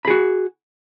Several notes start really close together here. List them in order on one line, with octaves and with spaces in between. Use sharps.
B5 G#4 F#4